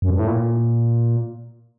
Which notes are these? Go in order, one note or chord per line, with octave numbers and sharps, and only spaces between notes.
F#2
G2
A2
A#2